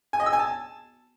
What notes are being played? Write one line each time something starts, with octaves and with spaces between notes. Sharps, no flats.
G#5
D#5
E6
G#5
A5